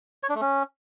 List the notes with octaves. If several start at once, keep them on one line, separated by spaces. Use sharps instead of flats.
C#5
D4
A3
C#4